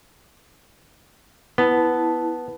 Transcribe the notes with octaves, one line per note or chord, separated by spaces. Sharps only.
B3 E4 A5